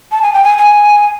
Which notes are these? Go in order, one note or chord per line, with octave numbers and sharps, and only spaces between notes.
A5
G#5
G5
G#5
G#5